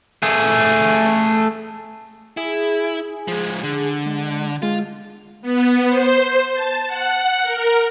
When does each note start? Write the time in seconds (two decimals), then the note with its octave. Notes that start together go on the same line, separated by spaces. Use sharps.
0.23 A3 G#4
2.37 E4 G#4
3.28 F3 G#3
3.63 D3
4.06 G#3
4.62 G#3 F4
5.42 B3
5.89 C5
6.54 A5
6.87 F#5
7.43 A#4